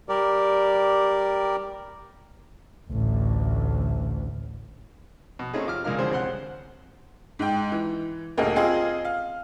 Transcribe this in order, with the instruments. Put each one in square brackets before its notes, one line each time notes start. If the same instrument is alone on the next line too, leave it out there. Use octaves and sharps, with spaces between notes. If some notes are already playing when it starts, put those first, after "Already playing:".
[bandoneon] G3 G4 A#4 D5
[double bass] A1 D2
[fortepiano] B2
C3 A3 C#4 D#4 G#4
F4 D6 F6
C#2 A#2 G#3 A#4 F5 F6
D2 B2 F3 C4 G#4 C5
C2 C5 F#5 C6 F#6
[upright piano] G#2 G5
E3
D#1 D2 A#3 G#4 D#5
C4 F4 G#4 D#5
F5